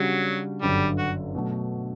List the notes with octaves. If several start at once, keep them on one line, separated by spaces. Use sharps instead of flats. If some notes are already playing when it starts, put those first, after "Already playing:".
Already playing: C#3 F#3 G3 D4 F#4
G1 F#2 D3 F#3 G3
F#4
B2 F#3 A3